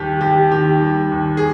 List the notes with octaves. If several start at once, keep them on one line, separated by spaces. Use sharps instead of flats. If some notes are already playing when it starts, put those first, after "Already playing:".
Already playing: D#2 G3 G4
D#2 G4
D#3 G4
G3
D#2
G#4